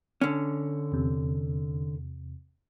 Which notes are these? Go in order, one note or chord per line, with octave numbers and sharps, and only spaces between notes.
D3 C#4
E2 C3